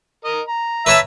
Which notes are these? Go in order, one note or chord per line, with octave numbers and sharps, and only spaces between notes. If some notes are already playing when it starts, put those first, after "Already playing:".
A#4 D#5
A#5
B4 C#5 E5 A5